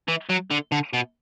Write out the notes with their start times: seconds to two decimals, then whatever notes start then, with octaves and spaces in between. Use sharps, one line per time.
0.08 E3
0.30 F#3
0.51 D3
0.72 D3
0.93 B2